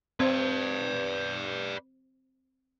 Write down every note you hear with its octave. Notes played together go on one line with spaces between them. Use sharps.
C4 B4 D5